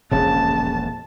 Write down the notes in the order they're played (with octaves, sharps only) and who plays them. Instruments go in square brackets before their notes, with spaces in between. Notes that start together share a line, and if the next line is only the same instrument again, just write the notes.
[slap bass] E1 A#1 F2 [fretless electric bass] C#3 [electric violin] A5